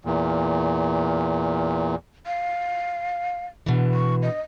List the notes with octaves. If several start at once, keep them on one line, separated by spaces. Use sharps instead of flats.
E2 A#2
F5
B2 D3 E3
C#6
D#5